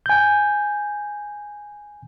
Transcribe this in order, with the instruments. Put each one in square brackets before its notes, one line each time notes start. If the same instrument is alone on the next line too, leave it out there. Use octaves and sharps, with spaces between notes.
[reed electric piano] G#5 G6